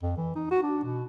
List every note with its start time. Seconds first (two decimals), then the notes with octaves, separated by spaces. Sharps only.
0.02 F2
0.17 E3
0.35 D#4
0.51 F#4
0.63 D4
0.84 B2